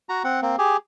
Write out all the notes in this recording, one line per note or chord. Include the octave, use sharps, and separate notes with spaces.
F#4 A#5
C4 F#5
A#3 C4
G4 G#4